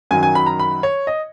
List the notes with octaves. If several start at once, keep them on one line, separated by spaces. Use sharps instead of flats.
F#2 D#3 F#3 G#5
G#5
B5
A#5
B5
C#5
D#5